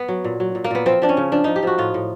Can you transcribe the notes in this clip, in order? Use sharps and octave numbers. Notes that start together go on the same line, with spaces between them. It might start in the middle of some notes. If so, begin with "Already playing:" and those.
Already playing: B3
F#3
A#2
F#3
A#2
A#3
A#2 B3
F3 C4
F3 D4
C#4
C#3
F3 D4
F3 D#4
G4
F3 F#4
A2 F4
A2